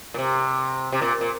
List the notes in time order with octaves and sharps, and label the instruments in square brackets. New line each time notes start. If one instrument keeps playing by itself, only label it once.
[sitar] A#2
C3
C3
A#2
A#2